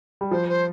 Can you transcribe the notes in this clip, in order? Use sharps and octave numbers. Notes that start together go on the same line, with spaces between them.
G3
F3 C5
C5